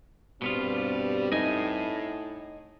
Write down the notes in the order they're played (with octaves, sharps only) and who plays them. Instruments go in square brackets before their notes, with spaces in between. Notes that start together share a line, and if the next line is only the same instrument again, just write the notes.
[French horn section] G2 C4 [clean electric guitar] B2 B3 F4 [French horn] G3
[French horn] A2 [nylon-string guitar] D#4 [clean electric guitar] D#5 G#5